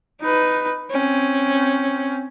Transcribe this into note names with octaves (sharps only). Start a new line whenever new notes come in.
D#4 B4
C4 C#4